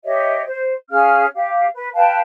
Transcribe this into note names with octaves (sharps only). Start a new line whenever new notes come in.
G4 C#5 D#5 E5
C5
C#4 G#4 F5 F6
G4 F5
B4
B4 F5 G5 A5